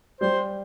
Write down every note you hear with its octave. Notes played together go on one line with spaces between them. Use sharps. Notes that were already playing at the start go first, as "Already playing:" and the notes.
G3 C5